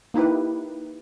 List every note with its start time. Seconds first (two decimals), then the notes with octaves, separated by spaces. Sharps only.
0.14 A#3 D#4 E4 G4 B4